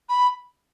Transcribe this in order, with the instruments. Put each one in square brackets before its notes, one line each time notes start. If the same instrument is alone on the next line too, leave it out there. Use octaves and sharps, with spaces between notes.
[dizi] B5